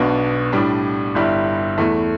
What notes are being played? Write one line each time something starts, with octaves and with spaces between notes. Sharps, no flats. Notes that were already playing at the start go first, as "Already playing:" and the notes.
Already playing: B1 B2 B3 D4
A2 G3 D4
G1 G2 G3 E4
E2 E3 A3